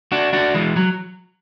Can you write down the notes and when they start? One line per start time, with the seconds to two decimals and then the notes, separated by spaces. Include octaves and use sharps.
0.12 D4 F#4
0.33 D4 F#4
0.54 E3 G#3
0.76 F#3